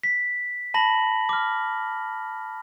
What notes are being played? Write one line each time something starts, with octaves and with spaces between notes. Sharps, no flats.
B6
A5 B5 A#6 F#7
D6 F6